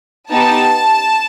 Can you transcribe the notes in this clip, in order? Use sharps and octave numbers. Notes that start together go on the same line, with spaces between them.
B3 D#4 G4 A5